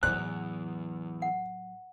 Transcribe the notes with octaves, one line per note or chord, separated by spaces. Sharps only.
E2 A2 F#3 F#6
F#5